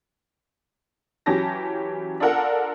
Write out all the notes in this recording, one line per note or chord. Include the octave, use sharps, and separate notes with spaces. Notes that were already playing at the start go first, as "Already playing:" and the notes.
E3 F#3 C#4 G4 A5 A#6
D4 F4 A4 A#4 F#5